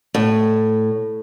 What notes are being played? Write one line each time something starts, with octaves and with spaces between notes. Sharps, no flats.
A2